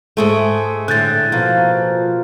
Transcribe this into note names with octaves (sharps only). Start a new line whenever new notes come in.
G#2 G#3 A3 G#4 A4 C#6
A2 D3 F#6 G6 A6
B2 F3 A#3 F4 A#4